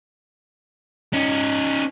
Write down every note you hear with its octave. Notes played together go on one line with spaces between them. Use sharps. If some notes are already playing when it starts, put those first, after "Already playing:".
C#4 D#4